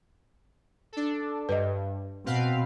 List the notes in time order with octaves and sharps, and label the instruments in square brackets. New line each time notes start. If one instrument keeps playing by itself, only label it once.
[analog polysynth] D4 A4
[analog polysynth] G2 [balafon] B4 D#5
[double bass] B2 [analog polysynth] C4 B4 F5